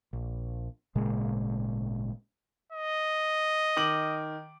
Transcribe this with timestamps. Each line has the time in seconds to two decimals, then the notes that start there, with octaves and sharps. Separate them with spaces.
0.13 A#1
0.95 G#1 A#2 C#3 G#3
2.72 D#5
3.76 D#3 D6 F#7